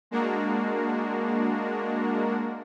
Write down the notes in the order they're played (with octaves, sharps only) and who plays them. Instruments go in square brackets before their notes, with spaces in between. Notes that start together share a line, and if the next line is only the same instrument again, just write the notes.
[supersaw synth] G#3 A#3 D4 F#4 A#4